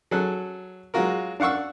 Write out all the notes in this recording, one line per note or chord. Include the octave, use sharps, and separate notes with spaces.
F#3 G#4 A4 F#6
F#3 G#3 F4 F#4 A#4
D4 F5 F#5 C#6 E6